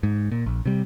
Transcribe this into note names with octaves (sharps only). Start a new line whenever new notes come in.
G#2
A#2
A#1
C3 G3